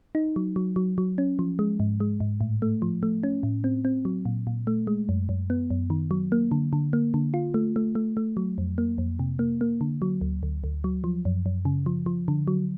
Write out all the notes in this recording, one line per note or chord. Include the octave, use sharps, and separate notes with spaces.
D#4
F#3
F#3
F#3
F#3
C#4
F3
G#3
G#2
G#3
G#2
A2
A3
F3
A3
C#4
A2
C4
C4
F#3
A#2
A#2
A3
G#3
F#2
F#2
B3
F#2
D#3
F#3
A#3
D3
D3
A#3
D3
F4
A3
A3
A3
A3
F#3
F2
A#3
F2
C3
A#3
A#3
D3
F#3
D2
D2
D2
F#3
F3
F#2
F#2
C#3
F3
F3
D3
F#3